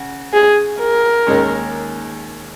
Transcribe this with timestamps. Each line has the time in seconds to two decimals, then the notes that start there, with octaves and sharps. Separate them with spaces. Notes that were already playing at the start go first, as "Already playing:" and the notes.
Already playing: C#3 F#4
0.33 G#4
0.80 A#4
1.27 D#2 D#3 G#3 C#4